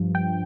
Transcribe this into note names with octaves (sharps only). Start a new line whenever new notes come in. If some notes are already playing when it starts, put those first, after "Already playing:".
Already playing: G2 F3
G5